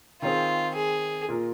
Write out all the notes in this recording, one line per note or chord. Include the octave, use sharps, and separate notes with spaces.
D#3 C4 F4 G#4
G#4
A#2 A#3 F4 A#4